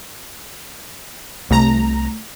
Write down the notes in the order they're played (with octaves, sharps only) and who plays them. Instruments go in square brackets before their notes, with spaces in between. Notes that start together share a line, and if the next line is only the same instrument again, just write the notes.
[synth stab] C2 A#5 [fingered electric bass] A3